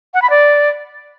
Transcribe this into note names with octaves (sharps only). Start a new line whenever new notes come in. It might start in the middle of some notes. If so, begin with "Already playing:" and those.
F#5
B5
D5